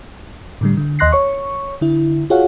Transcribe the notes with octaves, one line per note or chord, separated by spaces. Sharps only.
A2 D3 G3
D3
D#2 D#5 C6 F#6 A#6 C7
C#5 C#6
D3 E4
F4 F#4 G#4 C#5 F5 F#5